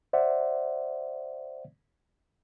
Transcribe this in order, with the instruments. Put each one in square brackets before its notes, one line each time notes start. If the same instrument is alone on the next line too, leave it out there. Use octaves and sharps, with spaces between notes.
[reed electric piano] C5 D5 E5 F#5